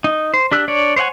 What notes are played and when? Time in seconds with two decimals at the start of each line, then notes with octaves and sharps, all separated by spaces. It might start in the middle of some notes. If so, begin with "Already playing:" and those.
0.04 D#4
0.34 C5
0.52 D4 G4 E6 F#6
0.68 D4 C#5 D5
0.96 C5 C#5 D#5 F#5 G#5